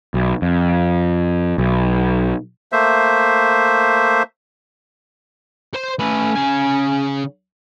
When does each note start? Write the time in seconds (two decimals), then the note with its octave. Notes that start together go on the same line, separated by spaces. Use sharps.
0.14 B1
0.42 F2
1.58 B1
2.72 A3 A#3 C5 E5
5.75 C5 C6
6.00 A3 C#4 B4
6.36 C#3 G#5